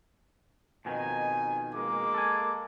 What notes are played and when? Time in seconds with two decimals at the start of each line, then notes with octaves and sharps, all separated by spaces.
0.85 F2 B2 D#3 D#4 G#5
1.74 G#3 A#3 D6
2.14 A4 G#5